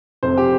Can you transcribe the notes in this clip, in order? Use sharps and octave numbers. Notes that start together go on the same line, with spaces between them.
F1 F2 C3 C5
G4